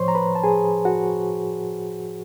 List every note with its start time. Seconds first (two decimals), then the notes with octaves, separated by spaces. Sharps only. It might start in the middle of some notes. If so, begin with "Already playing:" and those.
Already playing: A2 F3 C5 C#5 C6 C#6
0.08 A#5
0.15 B4 B5
0.35 A5
0.43 G#4 G#5
0.85 F#4 F#5